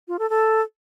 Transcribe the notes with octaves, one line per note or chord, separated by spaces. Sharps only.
F4
A4
A4